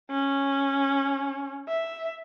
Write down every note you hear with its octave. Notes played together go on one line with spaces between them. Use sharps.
C#4
E5